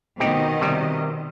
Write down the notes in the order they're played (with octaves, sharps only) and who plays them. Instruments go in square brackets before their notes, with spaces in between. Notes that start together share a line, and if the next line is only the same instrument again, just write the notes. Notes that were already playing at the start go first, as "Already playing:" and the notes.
[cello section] B2 D#3 D#5 [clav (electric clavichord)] C4 D#4 G4
[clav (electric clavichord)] C3 G3